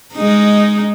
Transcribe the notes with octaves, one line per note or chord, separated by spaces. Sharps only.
G#3 D#4